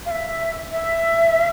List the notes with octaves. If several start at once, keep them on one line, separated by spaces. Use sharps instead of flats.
F5
E5
E5